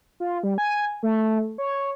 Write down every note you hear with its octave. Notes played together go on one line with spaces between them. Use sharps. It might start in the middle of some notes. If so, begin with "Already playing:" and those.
F4
G3
G#5
A3
C#5